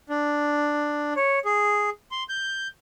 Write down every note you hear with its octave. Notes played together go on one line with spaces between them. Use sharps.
D4
C#5
G#4
C6
G6